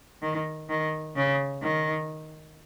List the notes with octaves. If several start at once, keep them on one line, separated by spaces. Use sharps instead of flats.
D#3
D#3
C#3
D#3